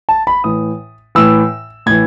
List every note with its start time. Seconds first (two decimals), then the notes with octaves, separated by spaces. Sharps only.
0.09 A5
0.27 B5
0.44 A2 E3 D#6
1.15 A2 E3 E6
1.86 A2 E3 G#6